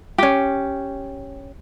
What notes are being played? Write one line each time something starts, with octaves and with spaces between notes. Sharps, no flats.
C#4 G4